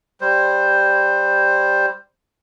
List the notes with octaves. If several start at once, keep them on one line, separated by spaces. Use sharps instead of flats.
G3 C5